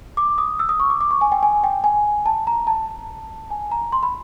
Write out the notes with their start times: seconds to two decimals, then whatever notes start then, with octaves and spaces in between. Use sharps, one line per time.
0.17 D6
0.38 D#6
0.59 E6
0.69 D#6
0.80 C#6
0.90 D6
1.01 D6
1.11 C#6
1.21 G#5
1.32 G5
1.43 G#5
1.64 G5
1.84 G#5
2.26 A5
2.47 A#5
2.67 A5
3.50 G#5
3.72 A#5
3.92 C6
4.03 B5